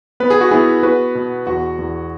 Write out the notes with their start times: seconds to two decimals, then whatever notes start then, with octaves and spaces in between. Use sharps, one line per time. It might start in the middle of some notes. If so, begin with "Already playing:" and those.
0.20 B3 B4
0.30 G#4
0.41 F#4
0.51 B3 E4 G#4
0.83 B3 F#4 B4
1.15 B2
1.47 E2 F#4
1.79 E2